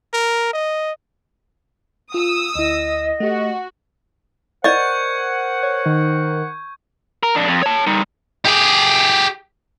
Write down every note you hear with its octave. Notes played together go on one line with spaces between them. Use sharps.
A#4
D#5
F4 D#6 E6
D2 E4 D#5
A3 F#4 G4
A#4 C5 D5 D#5 F#5 C#6 G6 G#6
C#5
D#3
A#4
F2 D4
F2
C#5 A5
G3 D#4
G4 G#4